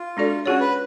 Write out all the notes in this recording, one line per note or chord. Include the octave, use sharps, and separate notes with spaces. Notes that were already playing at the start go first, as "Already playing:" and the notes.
Already playing: F4
G#3 D4 F#4 A4 D5
C#4 F4 F#4 G#4 C#5
B4